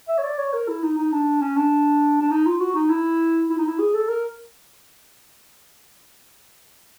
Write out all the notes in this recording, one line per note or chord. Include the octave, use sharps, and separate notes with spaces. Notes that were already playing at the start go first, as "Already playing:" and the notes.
E5
C#5
D5
C#5
A#4
E4
D#4
D#4
D4
C#4
D4
D4
D#4
F4
F#4
D#4
E4
E4
D#4
E4
G#4
A4
A#4